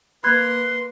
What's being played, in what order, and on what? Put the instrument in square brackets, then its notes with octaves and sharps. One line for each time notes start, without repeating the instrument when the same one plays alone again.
[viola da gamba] A#3 [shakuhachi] B4 [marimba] B5 F#6 G#6 [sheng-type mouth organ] C6